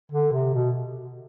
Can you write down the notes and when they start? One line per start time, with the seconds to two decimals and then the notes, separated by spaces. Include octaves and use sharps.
0.12 D3
0.32 C3
0.53 B2